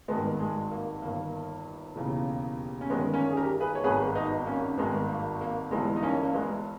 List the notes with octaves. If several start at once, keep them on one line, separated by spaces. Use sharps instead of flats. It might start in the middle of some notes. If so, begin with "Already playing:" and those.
G#1 G2 D#3 G#3 B3
G#3
A#3
G1 G2 D#3 A#3
E1 D#2 C#3 E3
C#4
G1 G2 D#3 G#3 B3
A#3 C#4
G#4
G4 A#4
G#4 B4
C#5
G#1 G2 D#3 G#4 B4
B3 D#4
A#3 C#4
G#1 G2 D#3 G#3 B3
A#3
A#3
G1 G2 E3 G#3 B3
D#4
A#3 C#4
A#3
G#3 B3